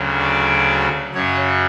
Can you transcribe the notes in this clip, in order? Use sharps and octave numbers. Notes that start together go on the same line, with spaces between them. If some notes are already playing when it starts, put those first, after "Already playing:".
Already playing: D2 C#3 F#3
D5
F#2 C#3 F#3 C#5